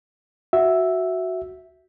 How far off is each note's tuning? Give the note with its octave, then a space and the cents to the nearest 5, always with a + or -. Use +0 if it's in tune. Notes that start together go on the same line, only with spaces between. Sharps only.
F#4 +0 E5 +0